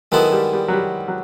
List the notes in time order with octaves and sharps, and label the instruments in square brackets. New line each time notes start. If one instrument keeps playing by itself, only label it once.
[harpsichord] D#3 G#3 B3 E4 A4 [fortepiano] F#3
[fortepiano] G3
G3
F#3
G3
F#3